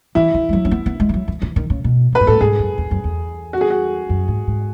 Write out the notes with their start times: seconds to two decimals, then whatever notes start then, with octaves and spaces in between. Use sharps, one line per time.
0.15 E3 E4
0.34 E3
0.49 G#3
0.53 F#3
0.65 C#4
0.71 B3
0.86 B3
1.00 G#3
1.09 E3
1.14 F#3
1.28 E3
1.42 E3
1.56 D#3
1.70 C#3
1.84 B2
2.13 A2
2.15 B4
2.20 G#2
2.27 A2 A4
2.41 G#2 G#4
2.59 F#2
2.78 E2
2.91 F#2
3.04 E2
3.53 F#4
3.61 G#4
3.70 F#4
4.09 F#2
4.28 G#2
4.47 G#2